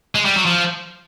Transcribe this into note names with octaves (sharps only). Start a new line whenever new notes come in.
G#3
G3
F#3
F3